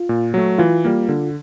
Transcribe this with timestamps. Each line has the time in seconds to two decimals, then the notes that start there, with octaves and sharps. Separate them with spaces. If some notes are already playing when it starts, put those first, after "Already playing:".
Already playing: F4
0.09 A#2
0.34 F#3 A3
0.58 E3 F4
0.85 G3 A#3
1.09 D3